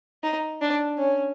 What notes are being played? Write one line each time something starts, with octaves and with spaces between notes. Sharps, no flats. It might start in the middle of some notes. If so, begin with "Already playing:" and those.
D#4
D4
C#4